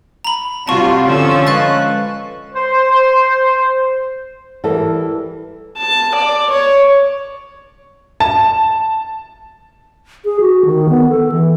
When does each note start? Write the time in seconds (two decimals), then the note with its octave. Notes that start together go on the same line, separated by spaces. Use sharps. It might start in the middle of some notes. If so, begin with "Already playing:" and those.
0.25 A#5 B5
0.68 C3 G3 C4 F4 F#4 A5 C#6
1.07 D3 F3 C#4 F4 A4 E6
1.46 G#3 B4 F5 C#6 F#6 A6
2.54 C5
4.64 E3 G3 A4 A#4
5.77 A5
6.14 D5
6.50 C#5
8.20 A5
10.25 G#4
10.40 F#4
10.65 D#3
10.89 B3
11.10 A4
11.32 E3